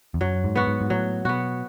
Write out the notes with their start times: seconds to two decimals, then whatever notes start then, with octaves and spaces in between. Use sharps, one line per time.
0.14 E2
0.21 F#2 F#3
0.44 G#2
0.56 B3 F#4
0.67 G#2
0.81 G#2
0.90 A2 F#3
1.25 B2 B3 F#4